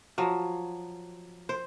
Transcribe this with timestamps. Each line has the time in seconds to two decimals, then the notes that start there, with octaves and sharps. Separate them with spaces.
0.18 F3 F#3
1.49 C5